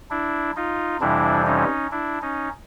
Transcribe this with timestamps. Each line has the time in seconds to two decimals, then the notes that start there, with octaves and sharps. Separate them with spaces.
0.10 D4 E4
0.56 D#4 F4
1.01 F2 C3 E3 G3 D4 E4
1.46 C#4 D#4
1.92 D4 E4
2.22 C#4 D#4